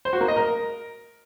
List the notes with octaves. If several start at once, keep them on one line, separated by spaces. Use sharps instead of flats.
C5
F#4
A#3
D#5
A#4